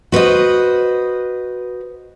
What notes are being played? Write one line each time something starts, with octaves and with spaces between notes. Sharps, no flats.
F#4 B4 C5 D#5